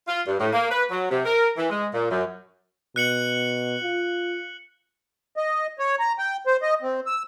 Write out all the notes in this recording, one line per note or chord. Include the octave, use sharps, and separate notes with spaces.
F4
G2
A2
A#3
B4
F#3
C3
A#4
E3
G#3
A#2
F#2
B2 F#6 C#7 F#7
F4
D#5
C#5
A#5
G5
C5
D#5
C4
E6